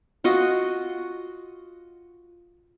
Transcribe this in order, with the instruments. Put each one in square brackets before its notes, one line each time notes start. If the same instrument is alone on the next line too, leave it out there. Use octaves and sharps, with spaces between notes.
[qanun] F4 F#4 D#5